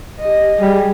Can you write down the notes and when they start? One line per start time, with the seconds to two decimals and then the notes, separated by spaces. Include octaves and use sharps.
0.20 G4 D#5
0.61 G3 G#4